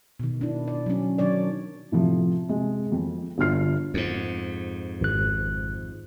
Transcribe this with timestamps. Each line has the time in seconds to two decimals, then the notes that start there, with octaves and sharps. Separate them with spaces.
0.20 B2 D#3
0.41 D4 E4
0.68 D5
0.86 F#3 C#4
1.18 D#3 F#3 D4 C#5 D5
1.92 A2 C3 F3
2.49 C3 G#3
2.92 F2 C4
3.38 G1 D3 F4 F6 C7
3.94 F2 G#2
5.01 G#1 F#6